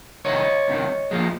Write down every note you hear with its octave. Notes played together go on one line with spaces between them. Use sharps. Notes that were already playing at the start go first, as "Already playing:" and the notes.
C2 C3 D#3 C#5 D#5
C2 C3 D#3
A#2 F3 G#3